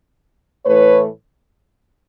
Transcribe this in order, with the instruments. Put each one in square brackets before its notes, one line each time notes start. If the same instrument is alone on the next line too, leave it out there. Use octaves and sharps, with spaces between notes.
[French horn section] A2 E3 A3 B4 C#5